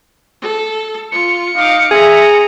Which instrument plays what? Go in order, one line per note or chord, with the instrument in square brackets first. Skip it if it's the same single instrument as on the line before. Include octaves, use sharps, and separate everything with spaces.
[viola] A4
[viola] F4 [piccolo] C#7
[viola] D#4 D6 [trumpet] F5
[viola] C4 A#5 [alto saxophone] G#4 [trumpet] E5